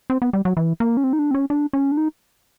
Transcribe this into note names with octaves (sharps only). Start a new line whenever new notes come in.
C4
B3
G3
F#3
E3
A#3
C#4
C4
D#4
D4
C4
C#4
D4
C#4
D4
D#4